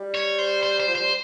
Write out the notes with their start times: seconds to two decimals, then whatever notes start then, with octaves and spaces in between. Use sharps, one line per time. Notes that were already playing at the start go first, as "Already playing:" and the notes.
Already playing: G3
0.15 C#5
0.38 C5
0.63 C5
0.80 C5
0.88 F3
0.95 G3 C5